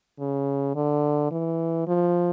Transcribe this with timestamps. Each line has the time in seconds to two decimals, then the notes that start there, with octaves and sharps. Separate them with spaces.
0.19 C#3
0.75 D3
1.31 E3
1.87 F3